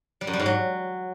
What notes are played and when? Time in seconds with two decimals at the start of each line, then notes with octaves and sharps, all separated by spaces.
0.21 G3
0.27 F#2
0.33 G3
0.40 G#2
0.46 F#3